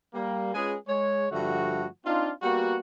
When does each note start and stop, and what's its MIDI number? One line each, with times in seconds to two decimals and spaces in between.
0.14 0.54 55
0.14 0.54 58
0.55 0.75 56
0.55 0.75 61
0.55 0.75 65
0.55 0.75 68
0.55 0.75 71
0.55 0.75 80
0.88 1.27 56
0.88 1.27 73
1.32 1.85 43
1.32 1.85 50
1.32 1.85 53
1.32 1.85 57
1.32 1.85 66
2.05 2.31 60
2.05 2.31 62
2.05 2.31 63
2.05 2.31 65
2.42 2.77 55
2.42 2.77 58
2.42 2.77 59
2.42 2.77 66